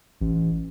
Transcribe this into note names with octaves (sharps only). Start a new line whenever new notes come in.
A1